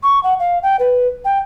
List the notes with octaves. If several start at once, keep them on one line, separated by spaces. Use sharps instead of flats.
C#6
F#5
F5
G5
B4
G5